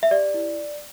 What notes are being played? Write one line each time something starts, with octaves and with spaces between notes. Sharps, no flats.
E5
G4 D5
E4